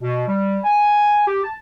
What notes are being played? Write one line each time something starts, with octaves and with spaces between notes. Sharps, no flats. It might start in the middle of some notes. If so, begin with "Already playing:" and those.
B2
G3
G#5
G4
A5